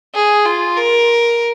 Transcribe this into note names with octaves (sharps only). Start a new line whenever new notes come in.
G#4
F4
A#4